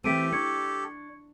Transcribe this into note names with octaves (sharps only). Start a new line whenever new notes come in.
E3 A3 C4 G4 A4 B6 D7 D#7
D4 C#6 G#6 C#7